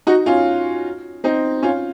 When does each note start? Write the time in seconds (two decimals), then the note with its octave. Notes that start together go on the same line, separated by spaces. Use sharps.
0.07 D#4 F#4
0.26 C#4 F4
1.24 C4 D#4
1.63 C#4 F4